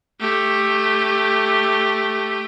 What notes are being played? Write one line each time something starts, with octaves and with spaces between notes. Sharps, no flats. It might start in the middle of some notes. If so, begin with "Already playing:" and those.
A3 G4